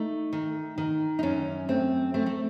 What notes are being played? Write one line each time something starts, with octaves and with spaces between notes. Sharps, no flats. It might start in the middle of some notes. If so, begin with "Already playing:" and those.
Already playing: A3 D#4
D#3
D#3
D#4
F#2 C#4
A3 C4
A3 C4
A3